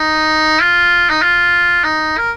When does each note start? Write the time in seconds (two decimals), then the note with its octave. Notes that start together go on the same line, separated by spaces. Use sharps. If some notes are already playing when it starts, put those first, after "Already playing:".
Already playing: D#4
0.62 F4
1.10 D#4
1.22 F4
1.84 D#4
2.18 A#4